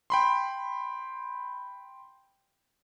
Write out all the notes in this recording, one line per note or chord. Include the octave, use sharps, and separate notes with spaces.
G5 B5 C6